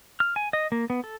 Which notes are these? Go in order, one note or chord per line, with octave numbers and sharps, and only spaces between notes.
F6
G#5
D#5
A#3
B3
A4